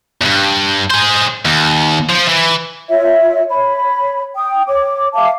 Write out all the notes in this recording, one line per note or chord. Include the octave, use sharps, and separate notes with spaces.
E2 G2
G#4 C5
D#2
F3
E3
F4 C#5 E5
C#5 B5
G5 D#6
C#5 D6
E5 F5 A5 D6